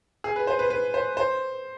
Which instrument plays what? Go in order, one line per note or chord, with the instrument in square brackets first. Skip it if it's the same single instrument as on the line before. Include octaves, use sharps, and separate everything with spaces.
[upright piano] G#4
B4
C5
B4
B4
C5
C5